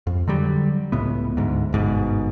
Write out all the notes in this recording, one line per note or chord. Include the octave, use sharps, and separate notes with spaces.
F2
D3 F#3 G3
C#2 A2 B3
D2 G#2
G1 G#2 B2